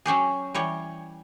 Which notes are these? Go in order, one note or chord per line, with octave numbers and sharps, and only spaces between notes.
F#3 C#4 G4 G#4
E3 G3 C#5